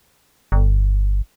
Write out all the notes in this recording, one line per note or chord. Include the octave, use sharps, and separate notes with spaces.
G1